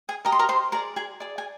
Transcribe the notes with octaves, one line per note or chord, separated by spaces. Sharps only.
G#4 G#5
G4 A#4 D#5 A#5
C6
A#4 A#5
C5 C6
G#4 A#4 D5 A#5
G#4 G#5
G#4 D5
G#5